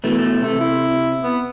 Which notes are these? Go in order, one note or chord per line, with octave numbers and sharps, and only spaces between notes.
B2 E3 A3
C3 A3
E4
B3